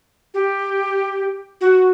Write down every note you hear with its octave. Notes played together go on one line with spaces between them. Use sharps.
G4
F#4